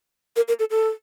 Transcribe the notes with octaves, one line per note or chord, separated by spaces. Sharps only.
A#4
A#4
A4
A4